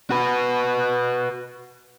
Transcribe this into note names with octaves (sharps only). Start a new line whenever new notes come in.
F#4 B4